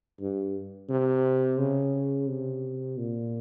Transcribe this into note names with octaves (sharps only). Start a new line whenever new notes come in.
G2
C3
C#3
C3
A#2